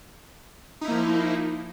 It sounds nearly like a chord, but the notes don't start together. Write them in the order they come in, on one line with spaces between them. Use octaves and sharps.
D#4 E4 A#3 F3